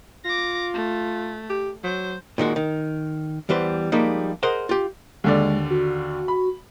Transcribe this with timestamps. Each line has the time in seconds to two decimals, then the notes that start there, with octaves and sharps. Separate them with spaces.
0.25 F4 D6 A#6
0.74 A3
1.50 G4
1.84 F#3 C5
2.38 A#2 D#3 G#3 F#4
2.56 D#3
3.49 E2 E3 G3 B4 C5
3.92 F3 G3 G#3 A#3 D#4
4.43 G#4 A#4 C5 D#5 F#5
4.69 F4 G4
5.24 D#2 D3 G#3 D5
5.70 F#4
6.28 B5